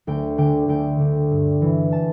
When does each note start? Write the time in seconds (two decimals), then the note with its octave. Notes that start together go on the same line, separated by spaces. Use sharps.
0.07 D2 G5
0.38 D3 G5
0.68 D2 G5
1.00 D3
1.31 G2
1.62 E3
1.92 A5